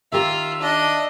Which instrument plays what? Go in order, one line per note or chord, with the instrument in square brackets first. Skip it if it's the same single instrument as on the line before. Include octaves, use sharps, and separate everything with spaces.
[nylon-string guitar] D#3 G4 A#4 [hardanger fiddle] F4 [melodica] E5
[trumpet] D4 [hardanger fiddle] D#5